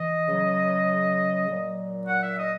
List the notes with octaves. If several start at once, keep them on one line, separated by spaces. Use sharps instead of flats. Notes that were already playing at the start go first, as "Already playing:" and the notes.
Already playing: E3 D#5
C#3 F#3
A#2 F#3
F#5
E5
D#5